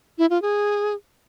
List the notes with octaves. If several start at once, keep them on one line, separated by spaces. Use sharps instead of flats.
E4
F4
G#4